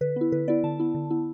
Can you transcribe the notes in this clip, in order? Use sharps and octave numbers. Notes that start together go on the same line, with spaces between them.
D3 B4
B3 E4
D3 B4
B3 E4 D5
D3 A5
B3 E4
D3
B3 E4